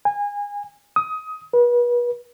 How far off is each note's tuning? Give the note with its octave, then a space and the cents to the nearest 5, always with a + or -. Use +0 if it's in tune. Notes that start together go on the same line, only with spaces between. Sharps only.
G#5 -25
D#6 +20
B4 -35